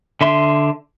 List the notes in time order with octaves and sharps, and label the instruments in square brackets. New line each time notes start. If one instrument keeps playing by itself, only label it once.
[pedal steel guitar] D3 E5 C6